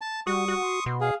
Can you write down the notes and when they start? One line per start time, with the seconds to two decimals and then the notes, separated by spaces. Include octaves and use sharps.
0.01 A5
0.27 G3 F#4 C#6 D#6
0.48 F#4
0.63 C6
0.86 B2
1.01 G#4 F5